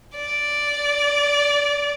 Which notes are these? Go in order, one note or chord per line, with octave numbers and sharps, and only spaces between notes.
D5